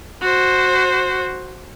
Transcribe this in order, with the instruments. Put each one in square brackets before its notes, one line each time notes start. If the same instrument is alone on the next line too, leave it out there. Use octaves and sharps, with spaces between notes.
[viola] F#4 C5